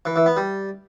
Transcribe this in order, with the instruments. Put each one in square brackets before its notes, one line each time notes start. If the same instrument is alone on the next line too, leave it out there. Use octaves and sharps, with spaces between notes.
[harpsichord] E3
E3
B3
G3